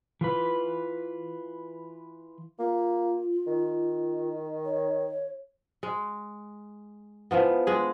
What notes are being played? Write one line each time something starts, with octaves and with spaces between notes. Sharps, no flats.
E3 F4 B4
A#3 F4
D#3
C#5
G#3
E3 F3 B3
G#3 D4 G#4